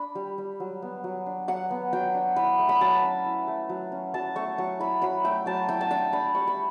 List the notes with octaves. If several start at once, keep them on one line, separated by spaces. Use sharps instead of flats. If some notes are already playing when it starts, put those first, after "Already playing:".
Already playing: D4 B5
G3
G3
F#3
B3
F#3
D4
F#3 F#5
B3
F#3 G5
D4
E4 B5
A3
B5
F#3 A5
C#4
E4
A3
F#3
C#4
F#3 A5
A3 C#6
F#3 C#6
E4 B5
F#3 B5
A3 G5
F#3 A5
E4 G5
A5
D4 G5
D4 B5
G3 C#6
B5